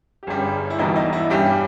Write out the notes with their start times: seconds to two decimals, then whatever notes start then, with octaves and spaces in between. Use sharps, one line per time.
0.23 G4
0.27 G1 G2 G3 C#4 G#4
0.70 E4
0.79 E1 E2 B2 G3 D#4
0.96 D#4
1.13 E4
1.30 G2 G3 C#4 G4